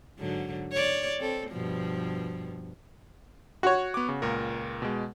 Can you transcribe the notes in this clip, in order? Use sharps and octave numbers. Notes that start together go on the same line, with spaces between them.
G#2 D3 F#3
C#5 D5
C4 A4
G2 B2 F3
F#4 C#5
B3 D6
C#3
C#2 A#2 A#4
B2 G#3